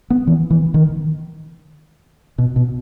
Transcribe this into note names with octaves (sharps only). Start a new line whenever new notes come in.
B3
E3
E3
D#3
B2
B2